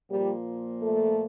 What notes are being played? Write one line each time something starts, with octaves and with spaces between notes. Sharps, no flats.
A#2 F3 G3 A#3 G4
A3 A4